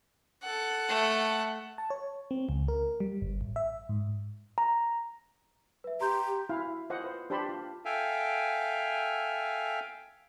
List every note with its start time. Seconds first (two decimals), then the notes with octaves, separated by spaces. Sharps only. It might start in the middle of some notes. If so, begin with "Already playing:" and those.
0.43 A4 F#5
0.88 A3
1.78 A5
1.90 C#5
2.31 C4
2.49 C#2
2.68 A#4
3.00 G3
3.22 G1
3.41 A1
3.56 E5
3.89 G#2
4.58 A#5
5.84 B4 E5
6.01 G4 A#5 C6 G6
6.49 E4 F#4 F5
6.90 F4 C5 D#5 F#5
7.04 B4 C5
7.30 D4 G4 C5 A5 B5 C6
7.49 F4
7.85 A4 E5 F5 G5 G#5